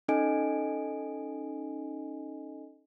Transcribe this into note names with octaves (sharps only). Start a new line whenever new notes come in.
C#4 D#4 A4 D#5 G#5 D7